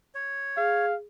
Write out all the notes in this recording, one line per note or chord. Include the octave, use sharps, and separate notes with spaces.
C#5
G#4 F5